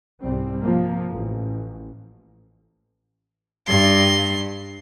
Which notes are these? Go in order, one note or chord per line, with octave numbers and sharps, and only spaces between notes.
C2 G#2 G3 C4
C3 F3 A#3
A1
G2 C6